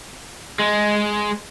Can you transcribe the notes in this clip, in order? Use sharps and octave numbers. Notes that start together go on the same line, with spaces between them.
G#3